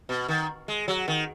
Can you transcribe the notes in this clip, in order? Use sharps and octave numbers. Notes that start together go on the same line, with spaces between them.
B2
D#3
G#3
F#3
D#3